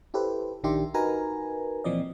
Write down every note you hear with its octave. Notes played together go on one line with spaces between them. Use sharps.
E4 G4 A4 B4 C5
A#1 D#3 D4 G4 E5 C6
D#4 F#4 A#4 B4 G#5 A#5
A#2 E3 F3 C4 D5 D#5